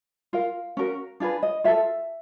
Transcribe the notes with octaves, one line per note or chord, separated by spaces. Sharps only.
F4 A#4 F5
C#4 F#4 A#4
D4 F4 G#4 B4
D#5
F4 A4 E5